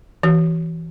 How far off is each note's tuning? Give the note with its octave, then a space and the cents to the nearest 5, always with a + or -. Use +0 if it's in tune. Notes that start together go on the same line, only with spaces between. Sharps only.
E3 +0 F#4 +40